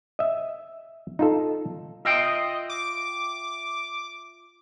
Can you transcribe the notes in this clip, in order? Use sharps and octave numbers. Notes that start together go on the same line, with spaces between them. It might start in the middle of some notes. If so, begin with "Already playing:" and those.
D#5 E5
D#4 F4 A4
F4 D#5 E5 G5
D6